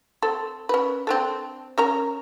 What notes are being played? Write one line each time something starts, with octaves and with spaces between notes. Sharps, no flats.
C4 A4
C#4 B4
C4 D4 A4
C#4 A#4 A#5